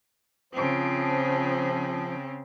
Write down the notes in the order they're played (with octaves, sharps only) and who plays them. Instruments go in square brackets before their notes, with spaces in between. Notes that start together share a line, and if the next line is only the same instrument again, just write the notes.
[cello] C#3 C4 [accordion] F3